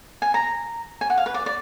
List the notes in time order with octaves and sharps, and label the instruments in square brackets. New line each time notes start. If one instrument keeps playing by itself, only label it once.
[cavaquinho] G#5
A#5
G#5
F#5
F5
B4
D5
D5